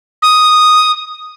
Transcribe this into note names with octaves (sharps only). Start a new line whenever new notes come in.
D#6